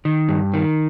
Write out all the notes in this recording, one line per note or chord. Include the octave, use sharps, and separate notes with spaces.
D#3
G2
D#3